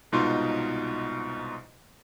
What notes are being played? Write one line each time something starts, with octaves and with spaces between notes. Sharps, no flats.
C2 G#2 B2 D#4 F4 C6